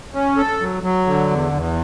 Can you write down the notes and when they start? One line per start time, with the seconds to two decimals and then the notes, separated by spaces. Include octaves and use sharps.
0.14 C#4
0.37 A4
0.60 F#3
0.83 F#3
1.07 D3
1.30 E2
1.53 E2